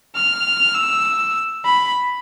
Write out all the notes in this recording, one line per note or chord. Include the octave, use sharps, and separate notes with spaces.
F6
E6
B5